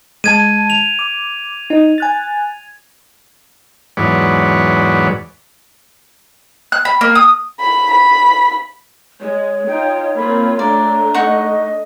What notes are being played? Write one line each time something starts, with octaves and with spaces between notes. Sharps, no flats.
G#3 A5 G#6 D#7
F7
D6
D#4
G#5 F#6 A6
E2 G#2 F#3 B4 C#5 D5
F#6
B5
A#3
D#6
B5
B5
G#3 C#5
D#4 F4 G5
A#3 C4 F4 B5
A3 D4 D5 A#5
D#4 D#5 F#5 C#6